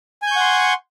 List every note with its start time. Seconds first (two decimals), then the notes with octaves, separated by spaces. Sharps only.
0.22 G#5
0.27 G6
0.31 C#6
0.36 F#5
0.41 C6